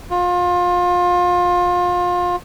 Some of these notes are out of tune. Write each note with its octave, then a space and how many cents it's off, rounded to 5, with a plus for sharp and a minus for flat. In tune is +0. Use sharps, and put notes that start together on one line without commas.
F4 +25